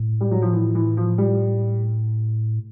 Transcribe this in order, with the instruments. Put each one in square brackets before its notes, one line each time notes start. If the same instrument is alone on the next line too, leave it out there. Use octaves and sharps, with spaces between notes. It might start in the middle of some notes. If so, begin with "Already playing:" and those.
Already playing: [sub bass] A2
[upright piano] G3
F#3
F3
E3
E3
F3
G3